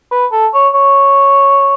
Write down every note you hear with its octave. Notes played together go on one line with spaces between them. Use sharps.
B4
A4
C#5
C#5